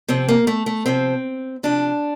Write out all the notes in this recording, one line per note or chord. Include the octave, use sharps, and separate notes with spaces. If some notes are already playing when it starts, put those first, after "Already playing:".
C3 F3 C4
A#3
A3
A3
C3 F3 C4
C3 F3 D4